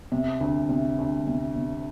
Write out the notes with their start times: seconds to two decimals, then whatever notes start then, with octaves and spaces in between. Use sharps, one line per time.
0.12 C3
0.41 D2
0.69 C3
0.98 D2
1.27 C3
1.56 C3